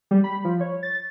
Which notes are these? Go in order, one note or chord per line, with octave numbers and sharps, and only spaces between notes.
G3
B5
F3
C#5
A6